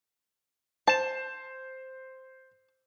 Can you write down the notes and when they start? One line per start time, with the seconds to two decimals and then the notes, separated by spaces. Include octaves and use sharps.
0.87 C5 A5 E7